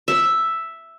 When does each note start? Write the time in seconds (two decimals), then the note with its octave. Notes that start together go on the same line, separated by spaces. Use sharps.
0.08 E5